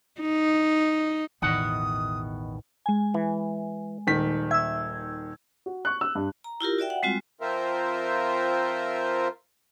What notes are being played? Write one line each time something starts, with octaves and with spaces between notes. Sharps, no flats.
D#4
A1 E2 B2 D#3 F#5 D#6
G#3 G#5
E3
D#1 D#3 B6
E5 E6 G#6
F#4
C#6 F#6
E6
G2
A#5
E4 F4 G4 A#4
F#4 D5 E5 G5
F#5
G3 G#3 C4 F4 F#4
F3 C4 F4 A#4 C5 E5